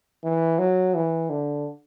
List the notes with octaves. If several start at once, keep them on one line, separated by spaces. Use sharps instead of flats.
E3
F#3
E3
D3